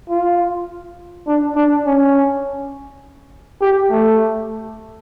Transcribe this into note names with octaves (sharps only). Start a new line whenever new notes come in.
F4
D4
D4
C#4
G4
A3